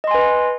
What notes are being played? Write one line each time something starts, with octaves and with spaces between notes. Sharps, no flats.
B4 D#5 G#5 C6